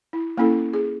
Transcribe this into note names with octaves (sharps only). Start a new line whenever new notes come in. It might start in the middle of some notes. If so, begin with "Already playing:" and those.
E4
A#3 C#4 E4 A4
G#4